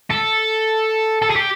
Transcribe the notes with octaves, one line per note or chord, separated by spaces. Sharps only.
A4
A4
G#4
G4